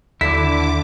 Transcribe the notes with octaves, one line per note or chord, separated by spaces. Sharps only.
D#2 D3 E4 D6 B6